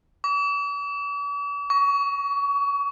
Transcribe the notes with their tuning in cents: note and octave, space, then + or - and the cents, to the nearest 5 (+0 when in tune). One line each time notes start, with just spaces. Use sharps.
D6 -45
C#6 +30